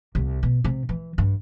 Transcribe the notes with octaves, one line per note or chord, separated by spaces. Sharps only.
C2
B2
C3
E3
G2